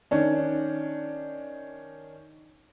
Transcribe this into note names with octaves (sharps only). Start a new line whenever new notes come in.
D#3 C#4 D4